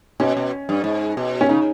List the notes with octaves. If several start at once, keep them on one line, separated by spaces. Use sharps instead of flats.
B2 C#4
B2
G2
G#2
B2
C#4
C#3 D#4